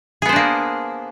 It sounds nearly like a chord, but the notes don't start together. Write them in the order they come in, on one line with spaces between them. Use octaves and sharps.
G#4 B3 C5 D4 A#3